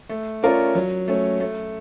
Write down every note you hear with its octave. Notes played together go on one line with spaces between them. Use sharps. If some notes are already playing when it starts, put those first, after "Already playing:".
A3
C#4 F4 A#4 D5
F#3
A3 C#4
A3